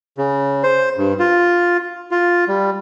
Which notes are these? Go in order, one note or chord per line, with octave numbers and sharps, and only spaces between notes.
C#3
C5
G2
F4
F4
G3